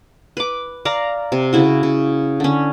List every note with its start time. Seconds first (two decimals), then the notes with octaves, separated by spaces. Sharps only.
0.37 B4 D6
0.85 D5 F5 A#5
1.32 C3
1.53 C#3 E4 F#4
1.83 C#3
2.40 D3 C#4